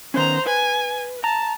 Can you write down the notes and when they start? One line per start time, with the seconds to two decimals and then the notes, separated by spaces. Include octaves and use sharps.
0.14 D#3 B3 C#4 C5 A#5
0.46 B4 G#5
1.24 A5 A#5